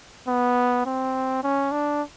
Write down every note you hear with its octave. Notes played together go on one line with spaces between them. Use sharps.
B3
C4
C#4
D4